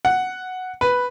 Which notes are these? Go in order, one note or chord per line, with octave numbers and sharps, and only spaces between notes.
F#5
B4